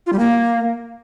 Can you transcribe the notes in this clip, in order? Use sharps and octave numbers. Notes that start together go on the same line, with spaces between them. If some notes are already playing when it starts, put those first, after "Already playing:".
F4
G3
A#3